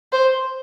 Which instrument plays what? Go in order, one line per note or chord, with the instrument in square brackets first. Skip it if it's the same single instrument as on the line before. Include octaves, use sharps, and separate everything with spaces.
[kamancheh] C5